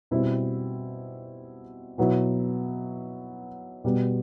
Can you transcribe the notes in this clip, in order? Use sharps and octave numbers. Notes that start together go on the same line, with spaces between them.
B2 G3 C4 E4
B2 F#3 B3 E4
B2 G3 B3